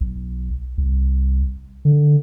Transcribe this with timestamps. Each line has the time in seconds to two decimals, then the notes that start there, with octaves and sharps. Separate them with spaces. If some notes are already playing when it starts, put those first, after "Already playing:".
0.01 B1
0.78 C2
1.85 D3